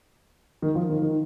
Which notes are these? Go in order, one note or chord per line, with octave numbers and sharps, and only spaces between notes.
D#3
F3
D#3
D#3